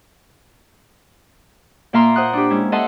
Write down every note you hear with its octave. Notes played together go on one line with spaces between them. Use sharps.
A#2 A#3 E5 F5 A#5 C6
C5 F#5 D#6 F#6
D4 G4
G#3 C#4 E4
A4 D#5 E5 F#5 A5 C6